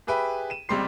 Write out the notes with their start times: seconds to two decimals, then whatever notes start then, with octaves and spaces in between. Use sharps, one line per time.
0.07 G4 G#4 B4 E5 G5
0.50 D#7 E7
0.69 C#2 C3 G3 G4 C6 C7